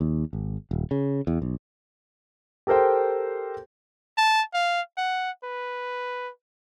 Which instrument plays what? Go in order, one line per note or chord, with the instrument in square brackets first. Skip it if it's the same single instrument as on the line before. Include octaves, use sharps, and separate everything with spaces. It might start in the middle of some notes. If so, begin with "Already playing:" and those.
[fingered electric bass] D#2
G#1
D#1
C#3
E2
B1
[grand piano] G4 A4 A#4 C5 G5
[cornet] A5
F5
F#5
B4